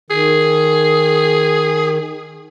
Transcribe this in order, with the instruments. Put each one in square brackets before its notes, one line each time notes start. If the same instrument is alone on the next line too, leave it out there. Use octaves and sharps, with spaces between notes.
[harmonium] D#3 [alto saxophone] G#4